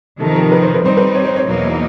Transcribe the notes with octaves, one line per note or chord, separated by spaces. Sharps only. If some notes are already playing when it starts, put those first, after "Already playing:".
F2 C3 D#3 A4
A#4
B4
C5
B4
G3 C4 D#4 C5
B4
C#5
C5
C#5
E2 B2 F#3 A#3 D#4